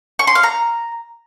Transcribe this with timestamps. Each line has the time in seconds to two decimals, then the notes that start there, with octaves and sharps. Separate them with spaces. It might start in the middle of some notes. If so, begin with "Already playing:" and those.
0.19 C#6
0.27 C6
0.35 F5
0.43 A#5